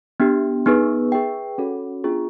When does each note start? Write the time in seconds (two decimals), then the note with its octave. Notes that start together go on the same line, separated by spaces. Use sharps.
0.20 B3 D4 G4
0.66 B3 D#4 G#4 B4
1.12 G#4 B4 E5 G5
1.58 C#4 F#4 A4 C#5
2.04 B3 D4 F4 G#4